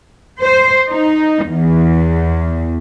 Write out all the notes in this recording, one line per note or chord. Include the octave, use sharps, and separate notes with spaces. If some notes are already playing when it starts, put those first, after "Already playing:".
C5
D#4
E2